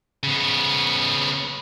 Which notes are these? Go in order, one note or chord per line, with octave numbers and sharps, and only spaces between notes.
C#3 B3